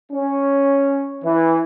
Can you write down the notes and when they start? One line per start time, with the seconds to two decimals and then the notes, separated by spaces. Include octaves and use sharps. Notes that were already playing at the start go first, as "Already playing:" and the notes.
0.12 C#4
1.24 E3